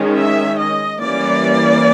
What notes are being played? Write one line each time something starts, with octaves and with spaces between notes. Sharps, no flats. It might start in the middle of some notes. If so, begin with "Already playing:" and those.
Already playing: D#3 G#3 C#4
E5
D#5
E3 G3 A#3 C#4 D5